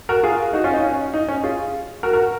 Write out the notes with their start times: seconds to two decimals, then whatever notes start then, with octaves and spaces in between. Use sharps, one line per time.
0.09 F#4 A#4
0.23 F4 G#4
0.53 D#4 F#4
0.64 C#4 F4
0.74 D#4
0.83 C#4
1.14 D#4
1.28 C#4
1.43 F4 G#4
2.03 F#4 A#4
2.13 F#4 A#4